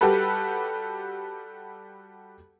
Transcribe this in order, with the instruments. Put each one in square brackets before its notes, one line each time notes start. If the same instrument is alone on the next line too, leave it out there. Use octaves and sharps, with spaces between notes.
[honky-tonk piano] G3 F#4 G4 A4 B4